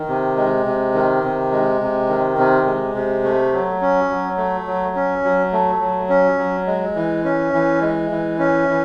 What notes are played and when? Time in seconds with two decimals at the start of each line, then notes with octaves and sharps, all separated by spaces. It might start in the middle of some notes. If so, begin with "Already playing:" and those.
Already playing: D#3
0.08 C3
0.37 G#3
0.66 C3
0.95 D#3
1.24 C3
1.52 G#3
1.81 C3
2.09 D#3
2.38 C3
2.66 G#3
2.95 C3
3.24 A3
3.53 F#3
3.82 C#4
4.10 F#3
4.38 A3
4.67 F#3
4.96 C#4
5.24 F#3
5.52 A3
5.81 F#3
6.09 C#4
6.38 F#3
6.67 G#3
6.95 E3
7.24 C#4
7.53 E3
7.81 G#3
8.11 E3
8.39 C#4
8.68 E3